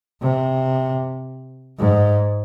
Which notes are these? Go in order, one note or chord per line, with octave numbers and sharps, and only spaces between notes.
C3
G#2